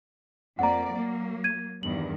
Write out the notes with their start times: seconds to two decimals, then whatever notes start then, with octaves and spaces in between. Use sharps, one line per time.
0.59 F2 A#3 D5 F#5 A#5
0.94 F#3 A#3
1.44 G#6 D#7
1.83 E2 G2 D#3 F#7